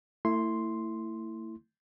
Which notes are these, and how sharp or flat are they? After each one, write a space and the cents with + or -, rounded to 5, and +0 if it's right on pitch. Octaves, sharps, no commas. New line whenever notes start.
A3 +35 E4 +0 C6 +0